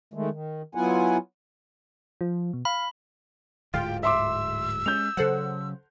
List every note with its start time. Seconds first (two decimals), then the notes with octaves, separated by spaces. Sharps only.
0.14 D#3 G#3 A3
0.31 D#3
0.75 F#3 B3 E4 F4 F#5 G#5
2.21 F3
2.53 B2
2.65 F5 B5
3.74 D1 G#2 D3 F4 G5
4.03 E5 C6 D6 E6
4.86 G#3 C#4 G6 F7
5.17 C#3 F#3 A4 C5 F#5